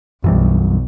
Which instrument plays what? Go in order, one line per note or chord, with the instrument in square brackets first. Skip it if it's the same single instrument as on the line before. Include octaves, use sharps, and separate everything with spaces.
[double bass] B1 [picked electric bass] F#2 E3 G3